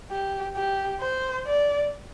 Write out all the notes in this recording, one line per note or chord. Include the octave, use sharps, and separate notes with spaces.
G4
G4
C5
D5